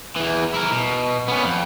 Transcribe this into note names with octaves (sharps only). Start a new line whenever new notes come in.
E2 E3
E4 A#4
B2
B3 C#4
F2